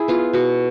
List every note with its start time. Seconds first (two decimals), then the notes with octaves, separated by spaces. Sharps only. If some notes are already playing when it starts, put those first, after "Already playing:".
Already playing: E4 G#4
0.08 B3 F4
0.33 B2 F#4